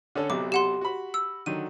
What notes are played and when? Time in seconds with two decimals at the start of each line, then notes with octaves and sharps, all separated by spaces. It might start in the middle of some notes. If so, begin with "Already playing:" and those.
0.15 D3 C#4 A4
0.30 B1 C3 F#3 D6
0.52 G4 F#5 C6
0.81 F#4 B5
1.14 E6
1.46 D3 D#3 F#3 D#7